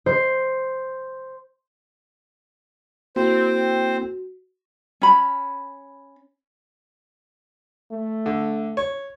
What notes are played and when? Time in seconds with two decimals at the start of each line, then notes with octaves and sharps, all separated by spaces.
0.06 C5
3.16 A#3 C4 E4 F#4 A4 C5
5.02 C#4 B5
7.91 A3
8.26 D3
8.77 C#5